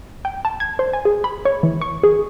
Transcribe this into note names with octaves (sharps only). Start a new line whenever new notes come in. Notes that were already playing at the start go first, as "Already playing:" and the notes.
G5
A5
G#6
C5
G#5
G#4
B5
C#5
E3
C#6
G#4